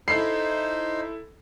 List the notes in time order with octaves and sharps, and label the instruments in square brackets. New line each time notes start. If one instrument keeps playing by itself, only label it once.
[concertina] D#4 C5 [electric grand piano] E4 A4 B5 [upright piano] C7